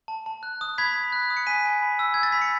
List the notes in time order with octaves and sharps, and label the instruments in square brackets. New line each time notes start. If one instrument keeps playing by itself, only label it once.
[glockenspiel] A5
A5
F#6
D#6
B5 G#6 B6
B5
F#6
D#6
C#7
G#5 B6 D#7
G#5
B5
E6
E6 G#6
A6
B5 B6
C#7